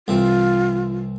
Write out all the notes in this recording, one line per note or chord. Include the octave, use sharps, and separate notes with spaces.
C2 E3 C4 F4